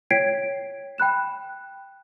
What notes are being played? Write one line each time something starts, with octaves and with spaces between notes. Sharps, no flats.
C#5 G5 G#6 B6 C7 D7
G5 B5 F#6 E7